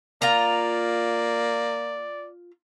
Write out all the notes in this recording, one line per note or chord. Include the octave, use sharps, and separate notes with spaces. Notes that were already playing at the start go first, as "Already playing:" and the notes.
A#3 F4 D5 A#5